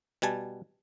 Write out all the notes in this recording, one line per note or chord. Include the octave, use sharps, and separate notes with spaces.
B2 G3 G#5 A5